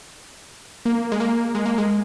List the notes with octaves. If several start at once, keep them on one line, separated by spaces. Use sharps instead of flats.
A#3
G#3
A#3
G#3
A#3
G#3